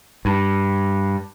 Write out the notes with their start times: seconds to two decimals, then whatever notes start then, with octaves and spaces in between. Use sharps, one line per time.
0.25 G2